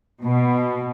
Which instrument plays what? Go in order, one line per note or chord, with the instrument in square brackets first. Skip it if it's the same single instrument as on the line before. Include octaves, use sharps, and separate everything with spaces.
[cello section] B2